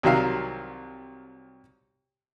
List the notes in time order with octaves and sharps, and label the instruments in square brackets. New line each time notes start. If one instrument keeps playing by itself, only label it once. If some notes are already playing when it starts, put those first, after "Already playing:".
[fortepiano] C2 D#3 F#3 E5 F5